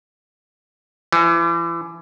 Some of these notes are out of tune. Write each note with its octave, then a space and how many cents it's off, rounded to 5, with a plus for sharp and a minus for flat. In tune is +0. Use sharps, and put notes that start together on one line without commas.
E3 +35